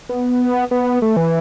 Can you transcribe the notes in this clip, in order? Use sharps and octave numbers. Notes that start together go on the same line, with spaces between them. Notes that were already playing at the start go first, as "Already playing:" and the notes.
B3
B3
A3
E3